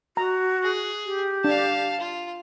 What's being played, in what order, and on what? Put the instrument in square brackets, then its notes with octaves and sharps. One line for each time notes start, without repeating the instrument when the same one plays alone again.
[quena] F#4 [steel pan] A#5
[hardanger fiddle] G#4
[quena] G4
[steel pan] D4 [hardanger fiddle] F5 A5
[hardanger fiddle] F4